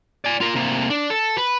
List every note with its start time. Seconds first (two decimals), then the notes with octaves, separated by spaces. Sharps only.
0.25 D5 G#5
0.41 F4 A#4
0.55 C3 A#3
0.90 D4
1.10 A4
1.38 B4